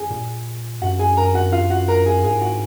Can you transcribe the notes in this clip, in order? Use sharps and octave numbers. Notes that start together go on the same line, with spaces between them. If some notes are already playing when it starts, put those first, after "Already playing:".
Already playing: G#4 G#5
A#2
F#2 F#4 F#5
G#4 G#5
A#4 A#5
F#4 F#5
F4 F5
F#4 F#5
A#4 A#5
G#4 G#5
G#2 G#4 G#5
F#4 F#5